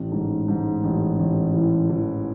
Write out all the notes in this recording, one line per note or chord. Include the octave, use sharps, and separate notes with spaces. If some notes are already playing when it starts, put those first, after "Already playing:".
Already playing: A1
G#2
G#2
A1
A1
E3
E3